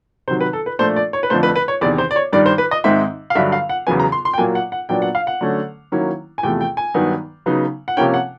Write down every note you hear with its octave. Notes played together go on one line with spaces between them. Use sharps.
C3 D#3 F#3 C5
B4
A4
B4
A#2 F3 A3 D4 C5
D5
C#5
B4
F2 D3 F3 A3 C5
B4
B4
C#5
E2 C3 D#3 D5
C5
D5
C#5
G2 D#3 G3 D5
C5
B4
D#5
G#2 D#3 G#3 C4 D#4 E5
F5
G2 D3 F#3 E5
F5
F#5
E2 C#3 F#3 B3 G#5
A#5
C6
C6
G5
A#2 F#3 A#3 G#5
F#5
F#5
A#2 F#3 B3 D4 G5
F#5
F5
F#5
D3 F#3 A3 C#4
D#3 F#3 A#3 C#4 E4
G#5
E2 C3 F3 A3 G5
G5
G#5
G2 D#3 F#3 B3 D#4
C#3 F#3 B3 D#4
F#5
C3 F3 A#3 C#4 G5
F#5